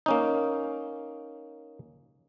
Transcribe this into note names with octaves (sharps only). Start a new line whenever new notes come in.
A#3 C#4 D#4